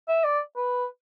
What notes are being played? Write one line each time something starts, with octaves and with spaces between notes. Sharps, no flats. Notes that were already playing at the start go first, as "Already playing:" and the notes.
E5
D5
B4